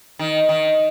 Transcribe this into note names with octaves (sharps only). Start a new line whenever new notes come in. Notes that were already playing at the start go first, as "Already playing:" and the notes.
D#3
D#3